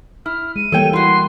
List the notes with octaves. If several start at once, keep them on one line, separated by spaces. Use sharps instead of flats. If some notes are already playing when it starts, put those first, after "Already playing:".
E4 F6
G#3 D#7
E3 G3 A#3 A4 C#5 G5
E4 F#4 C6